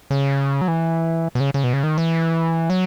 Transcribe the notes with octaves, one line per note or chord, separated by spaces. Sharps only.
C#3
F#3
E3
B2
C#3
C#3
B2
C#3
D#3
E3
F#3